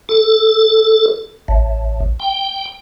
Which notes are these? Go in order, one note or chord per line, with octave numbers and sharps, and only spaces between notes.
A4
A1
G5